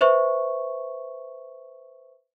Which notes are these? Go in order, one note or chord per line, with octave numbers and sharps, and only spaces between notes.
B4 C5 E5 C#6